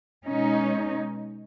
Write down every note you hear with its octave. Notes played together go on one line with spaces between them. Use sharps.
B2 G#3 C#4 D#4